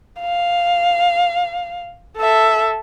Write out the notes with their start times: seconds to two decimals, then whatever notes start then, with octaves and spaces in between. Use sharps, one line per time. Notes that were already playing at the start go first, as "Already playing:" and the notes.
0.21 F5
2.17 A4 E5